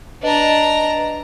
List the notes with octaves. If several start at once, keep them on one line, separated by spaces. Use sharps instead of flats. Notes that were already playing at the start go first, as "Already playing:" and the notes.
D4 B4 D#5 A#5